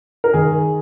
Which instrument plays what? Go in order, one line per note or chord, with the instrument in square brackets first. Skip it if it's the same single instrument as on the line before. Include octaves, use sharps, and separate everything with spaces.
[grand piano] A#4
D#3 G#4